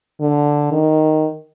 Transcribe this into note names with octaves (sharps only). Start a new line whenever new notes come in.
D3
D#3